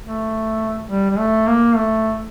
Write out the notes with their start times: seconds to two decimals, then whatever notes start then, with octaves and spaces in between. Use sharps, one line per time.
0.04 A3
0.90 G3
1.10 G3
1.18 A3
1.47 A#3
1.75 A3